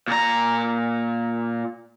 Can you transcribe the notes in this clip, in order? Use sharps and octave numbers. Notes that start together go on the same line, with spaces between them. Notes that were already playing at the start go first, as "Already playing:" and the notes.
A#2 A#5